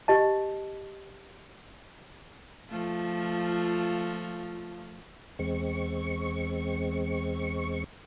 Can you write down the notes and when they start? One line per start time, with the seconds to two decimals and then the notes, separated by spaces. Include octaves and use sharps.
0.08 G4 D#5 A5
2.69 F3 A3 F4
5.39 E2 G#3 C4 C#6